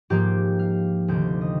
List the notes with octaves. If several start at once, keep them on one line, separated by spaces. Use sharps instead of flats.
G#2 F3 A#3 G4
F5
D2 C3 D#3 G5
D#5